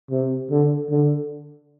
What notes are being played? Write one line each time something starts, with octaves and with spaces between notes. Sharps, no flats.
C3
D3
D3